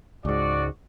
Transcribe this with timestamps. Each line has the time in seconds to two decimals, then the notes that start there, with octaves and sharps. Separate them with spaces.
0.25 C#2 G#2 F#4 D5